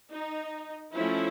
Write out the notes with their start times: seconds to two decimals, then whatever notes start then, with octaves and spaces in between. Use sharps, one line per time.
0.12 D#4
0.95 F3 A3 C#4 E4